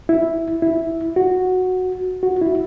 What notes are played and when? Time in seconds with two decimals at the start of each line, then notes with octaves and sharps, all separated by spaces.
0.09 E4
0.62 E4
1.16 F#4
2.23 F#4
2.41 E4